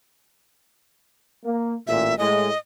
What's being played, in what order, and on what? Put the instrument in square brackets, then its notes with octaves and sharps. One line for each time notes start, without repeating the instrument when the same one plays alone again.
[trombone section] A#3
[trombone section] A1 A#2 [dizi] E5
[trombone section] A2 G#3 [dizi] D#5